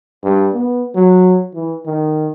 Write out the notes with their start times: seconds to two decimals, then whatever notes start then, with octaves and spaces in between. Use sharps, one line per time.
0.23 G2
0.54 B3
0.95 F#3
1.54 E3
1.85 D#3